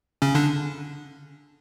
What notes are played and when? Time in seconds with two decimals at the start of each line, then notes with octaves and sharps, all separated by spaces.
0.22 C#3 C#4
0.35 D3 D4